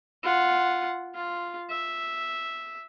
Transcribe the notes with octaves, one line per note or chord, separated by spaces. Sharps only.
F4 F#5
F4
E5